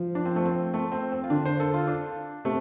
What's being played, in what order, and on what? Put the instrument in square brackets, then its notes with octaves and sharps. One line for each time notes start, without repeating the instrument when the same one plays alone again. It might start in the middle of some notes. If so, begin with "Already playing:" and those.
Already playing: [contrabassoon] F3
[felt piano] D4
C4
A3
C4
A3
C4
C4
F4
[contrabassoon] D3 [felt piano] D4
[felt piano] C5
A4
F4
D4
[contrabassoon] C3 [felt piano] A3